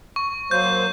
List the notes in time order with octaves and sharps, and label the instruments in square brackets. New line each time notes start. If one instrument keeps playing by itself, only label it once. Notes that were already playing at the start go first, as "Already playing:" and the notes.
[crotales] C#6
[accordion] F#3 A#3 C5 [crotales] G6